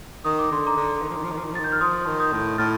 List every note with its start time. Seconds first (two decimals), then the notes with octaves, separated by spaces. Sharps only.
0.25 D#3 D#6
0.39 D6
0.51 D3 C6
0.67 A#5 D6
0.76 D3
1.02 D#3
1.10 F3
1.16 D#3
1.24 F3
1.31 D#3
1.37 F3
1.44 D#3
1.52 F3
1.55 A6
1.59 D#3
1.64 G6
1.72 F6
1.80 F3 C6 D#6
2.06 D#3
2.20 D#6 G6
2.33 A2
2.58 A2 F6 A6